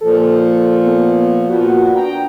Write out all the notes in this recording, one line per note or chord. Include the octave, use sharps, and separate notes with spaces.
A#2 F3 A4
B3
A#2 F3 B3 F#4
D4 G5 A#5